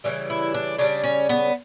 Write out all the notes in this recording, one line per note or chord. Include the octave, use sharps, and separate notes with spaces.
C#3 E3 G3
E4
D4
C#3 E3 G3 D4
C#4
B3